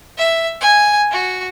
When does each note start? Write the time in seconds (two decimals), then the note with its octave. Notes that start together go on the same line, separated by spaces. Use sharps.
0.18 E5
0.61 G#5
1.12 F#4